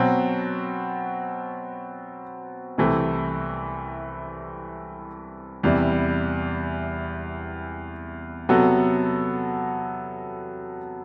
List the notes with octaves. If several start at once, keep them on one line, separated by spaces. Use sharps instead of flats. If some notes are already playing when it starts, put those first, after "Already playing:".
Already playing: B2 F#3 C4 F#4
C2 C3 E3 A3 C4
E2 C3 E3 G3
C3 F#3 B3 F#4 A4